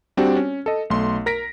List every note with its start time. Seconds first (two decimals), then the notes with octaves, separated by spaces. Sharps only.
0.17 G3 C4 D4 F#4 G4
0.37 C#4
0.66 A4 D#5
0.90 B1 A3 C6
1.26 A#4 A#6 B6 D7